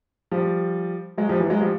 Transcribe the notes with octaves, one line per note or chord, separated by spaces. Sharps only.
F3 G3
F#3 G#3
F3 G3
E3 F#3
F#3 G#3
F3 G3